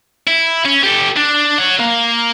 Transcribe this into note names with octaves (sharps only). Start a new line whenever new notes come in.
E4
C#4
G4 A4
D4
C#5 F#5
A#3